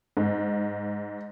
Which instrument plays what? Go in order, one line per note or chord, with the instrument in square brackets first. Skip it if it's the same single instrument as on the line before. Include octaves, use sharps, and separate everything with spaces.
[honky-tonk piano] G#2